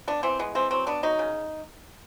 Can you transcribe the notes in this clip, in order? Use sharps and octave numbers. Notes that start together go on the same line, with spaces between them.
B3 D4
E3 C4
G#3 B3
E3 C4
F#3 C4
B3 D4
F#3 D#4
C#3